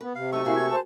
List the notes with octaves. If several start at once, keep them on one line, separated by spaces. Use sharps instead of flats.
B3 B4
C3 F5
F#3 A3 D#4 A4 C#6
A#3 E4 F#4 G#4 F5
G#6
C5 A5